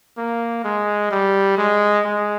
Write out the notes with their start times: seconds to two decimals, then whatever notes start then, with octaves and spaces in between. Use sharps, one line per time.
0.18 A#3
0.65 G#3
1.11 G3
1.58 G#3
2.05 G#3